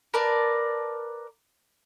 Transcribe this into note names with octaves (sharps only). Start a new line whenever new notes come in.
A#4 B4 D5 A5